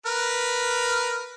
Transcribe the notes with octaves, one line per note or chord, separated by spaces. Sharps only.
A#4 B4 F6